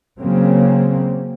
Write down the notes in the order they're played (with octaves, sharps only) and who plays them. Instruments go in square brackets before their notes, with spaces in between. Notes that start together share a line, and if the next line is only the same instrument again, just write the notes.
[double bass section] C#3 F#3 A#3 C4